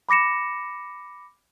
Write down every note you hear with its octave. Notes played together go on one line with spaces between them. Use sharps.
B5 D6 A#6 C#7 E7